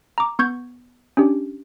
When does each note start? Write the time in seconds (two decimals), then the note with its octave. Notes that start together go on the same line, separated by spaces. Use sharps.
0.18 A#5 D6
0.39 B3 C#6 G6 G#6
1.17 C#4 D4 G4